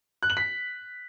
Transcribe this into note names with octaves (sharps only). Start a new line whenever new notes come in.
F#6
F#7
B6